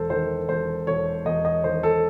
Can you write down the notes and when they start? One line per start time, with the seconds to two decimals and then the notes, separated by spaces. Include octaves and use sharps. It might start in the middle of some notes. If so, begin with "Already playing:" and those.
Already playing: E1 A4 C5
0.10 D#3 C5
0.49 E1 C5
0.87 E1 C#5
1.25 E1 D#5
1.45 D#5
1.64 D#3 C5
1.83 A4